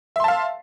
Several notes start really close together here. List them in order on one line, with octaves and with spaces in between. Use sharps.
E5 C6 A5 F5